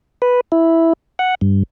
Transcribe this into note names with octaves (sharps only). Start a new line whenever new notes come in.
B4
E4
F#5
G2